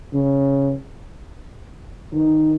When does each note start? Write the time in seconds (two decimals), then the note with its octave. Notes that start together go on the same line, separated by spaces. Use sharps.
0.14 C#3
2.14 D#3